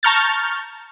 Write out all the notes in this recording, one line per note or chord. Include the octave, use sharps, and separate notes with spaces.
A5 A#5 C#6 F6 G6 A6